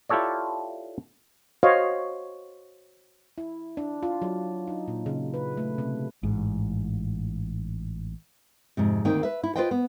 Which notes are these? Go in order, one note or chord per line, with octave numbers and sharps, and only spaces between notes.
E4 F4 G4 A4 C#5 D5
F#4 C5 C#5 D#5 F5
E4
D4
F4
F#3
D#4
A#2
C#3
B4
A3
C3
A1 G#2
F2 G#2 C3
D2 D#3 A#3 C4 D#4 G5
B4 E5
E4
F4 A4 B4 C5 D#5 G5
B3